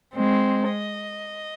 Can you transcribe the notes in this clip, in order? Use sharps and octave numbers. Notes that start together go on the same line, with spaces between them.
G#3 C4
D#5